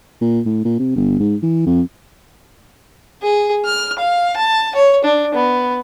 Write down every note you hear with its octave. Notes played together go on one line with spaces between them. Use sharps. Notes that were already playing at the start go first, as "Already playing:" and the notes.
A#2
A2
A#2
C3
G1
G#2
E3
F2
G#4
F6
F5
A5
C#5
D4
B3